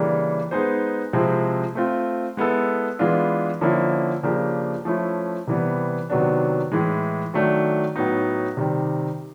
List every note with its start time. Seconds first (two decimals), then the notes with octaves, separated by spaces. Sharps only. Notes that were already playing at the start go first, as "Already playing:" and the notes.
Already playing: C#3 E3 G3 A#3 D4
0.51 G#3 B3 D#4 G#4 C5
1.13 C3 F3 G#3 C4 E4
1.75 A3 C4 F4
2.37 G#3 B3 E4 A4
2.99 E3 G#3 B3 D4 F4
3.61 D3 F3 A#3 C#4 E4
4.23 C#3 F3 A#3 D4 G4
4.85 F3 A3 C#4 E4
5.47 C3 E3 G3 B3
6.10 C3 D#3 F#3 B3 D4
6.72 A2 E3 G#3
7.34 D#3 F#3 A3 D4
7.96 A2 F#3 B3 D#4
8.57 C3 D#3 G3